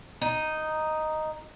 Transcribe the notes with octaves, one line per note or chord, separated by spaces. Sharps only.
D#4